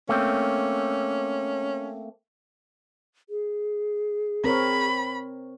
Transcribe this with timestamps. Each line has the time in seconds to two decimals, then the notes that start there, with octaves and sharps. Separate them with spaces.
0.09 A3 A#3 C4 C#4
3.30 G#4
4.44 C4 A#4 C#5 B5